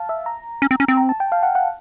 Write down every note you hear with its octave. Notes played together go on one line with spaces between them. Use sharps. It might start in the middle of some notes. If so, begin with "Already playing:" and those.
Already playing: F5 A5
E5
A#5
C#4
C4
C#4
C4
A#5
A5
G5
F5
F#5
F#5